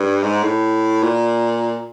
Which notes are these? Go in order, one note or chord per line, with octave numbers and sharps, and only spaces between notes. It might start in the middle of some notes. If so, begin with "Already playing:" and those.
Already playing: G2
G#2
A2
A#2